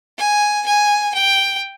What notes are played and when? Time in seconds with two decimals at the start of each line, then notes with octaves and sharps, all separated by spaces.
0.18 G#5
0.66 G#5
1.15 G5